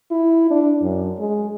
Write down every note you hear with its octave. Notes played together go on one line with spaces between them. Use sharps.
E4
D4
F#2
G#3